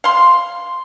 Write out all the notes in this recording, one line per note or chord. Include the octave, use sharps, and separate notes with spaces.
F5 C6